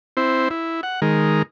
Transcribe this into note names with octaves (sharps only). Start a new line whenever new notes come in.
C4 E4 C5
E4
F#5
D#3 G#3 A#4